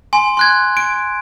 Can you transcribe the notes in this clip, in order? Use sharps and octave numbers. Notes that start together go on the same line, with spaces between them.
G#5 C6
C6 F#6 G#6
D7